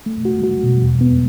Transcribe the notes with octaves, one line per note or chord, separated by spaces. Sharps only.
A3
F#4
F#4
B2
E2
B3